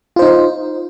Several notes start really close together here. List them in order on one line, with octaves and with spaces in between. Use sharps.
F4 C5 D#4